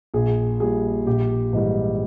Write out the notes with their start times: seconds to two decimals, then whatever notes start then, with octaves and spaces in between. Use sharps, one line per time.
0.14 A#1 G#4
0.60 A#2 G3 G#4
1.06 A#1 G4
1.53 G#2 E3 G3